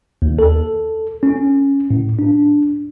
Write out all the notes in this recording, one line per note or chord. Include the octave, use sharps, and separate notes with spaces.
D#2
A4
C#4
A2
D4